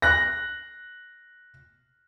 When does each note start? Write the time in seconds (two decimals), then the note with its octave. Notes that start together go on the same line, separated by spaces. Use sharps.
0.02 F#6 A#6